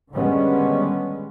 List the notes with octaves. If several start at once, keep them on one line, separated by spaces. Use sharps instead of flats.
D3 D#3 G3 G#3 B3 C#4